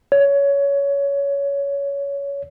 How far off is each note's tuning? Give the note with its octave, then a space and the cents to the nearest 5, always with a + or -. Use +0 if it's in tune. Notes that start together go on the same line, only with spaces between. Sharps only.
C#5 +20